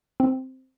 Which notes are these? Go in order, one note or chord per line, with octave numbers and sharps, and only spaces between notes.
C4